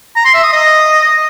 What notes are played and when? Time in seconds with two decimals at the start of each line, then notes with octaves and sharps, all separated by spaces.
0.16 A#5
0.25 C6
0.34 E5
0.43 D#6
0.52 D#5